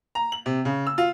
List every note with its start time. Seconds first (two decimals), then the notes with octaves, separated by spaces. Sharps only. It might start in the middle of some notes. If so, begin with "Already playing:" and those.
0.15 A#5
0.32 F#7
0.46 C3
0.65 C#3
0.87 E6
0.98 F4